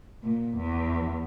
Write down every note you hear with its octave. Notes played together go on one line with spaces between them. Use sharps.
A#2
E2